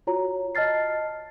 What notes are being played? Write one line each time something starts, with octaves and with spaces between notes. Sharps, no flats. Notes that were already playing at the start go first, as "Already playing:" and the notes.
F4 F#4 C#5 A#5
D#5 A5 F6 A6 C7